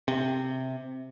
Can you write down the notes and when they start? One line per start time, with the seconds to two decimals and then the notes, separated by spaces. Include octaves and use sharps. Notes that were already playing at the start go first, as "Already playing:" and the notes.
0.08 C3